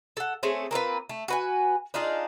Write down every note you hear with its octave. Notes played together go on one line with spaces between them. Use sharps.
A4 F#5
A3 C4 C#4 G#4
A#3 C4 F4 B4
A3
F#4 B4 G#5
D4 D#4 F4 G#4